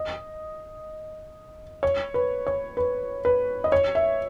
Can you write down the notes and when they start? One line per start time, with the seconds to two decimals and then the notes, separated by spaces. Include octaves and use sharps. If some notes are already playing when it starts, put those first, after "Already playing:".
Already playing: D#5
1.83 C#5
2.14 B4
2.47 C#5
2.77 B4
3.25 B4
3.64 D#5
3.72 C#5
3.95 E5